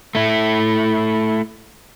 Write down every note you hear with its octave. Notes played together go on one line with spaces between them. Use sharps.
A3 E4